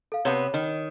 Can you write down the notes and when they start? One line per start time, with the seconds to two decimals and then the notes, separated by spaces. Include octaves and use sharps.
0.12 A4 F5
0.25 C3 B3 C#5
0.54 D#3